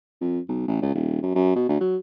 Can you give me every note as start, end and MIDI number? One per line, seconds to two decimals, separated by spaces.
0.21 0.39 41
0.49 0.65 35
0.68 0.80 33
0.82 0.90 37
0.94 1.22 27
1.22 1.30 42
1.35 1.55 42
1.56 1.67 47
1.69 1.80 38
1.81 1.97 54